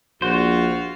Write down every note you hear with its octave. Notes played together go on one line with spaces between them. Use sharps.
A#1 F4 F#4 C5 F5